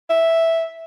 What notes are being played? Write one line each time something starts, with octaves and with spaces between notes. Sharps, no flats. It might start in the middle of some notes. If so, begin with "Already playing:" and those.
E5